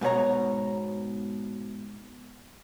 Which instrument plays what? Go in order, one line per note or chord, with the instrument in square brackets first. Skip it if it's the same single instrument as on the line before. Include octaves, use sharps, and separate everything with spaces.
[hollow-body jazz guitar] G#2 B2 B4 C#5 A#5